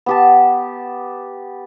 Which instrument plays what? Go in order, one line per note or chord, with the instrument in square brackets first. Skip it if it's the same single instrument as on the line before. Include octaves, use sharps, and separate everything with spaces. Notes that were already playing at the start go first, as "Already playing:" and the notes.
[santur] B3 G4 A5